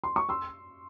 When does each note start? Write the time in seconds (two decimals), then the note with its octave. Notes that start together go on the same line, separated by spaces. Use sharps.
0.04 C6
0.16 C#6
0.29 C6 E6